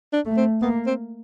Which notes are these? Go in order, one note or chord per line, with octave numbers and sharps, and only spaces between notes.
D4
A3
C4
A#3 B3
C4